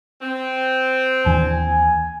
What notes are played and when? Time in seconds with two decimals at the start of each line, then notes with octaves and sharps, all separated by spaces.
0.22 C4
1.26 D#2 E3 D4 G#5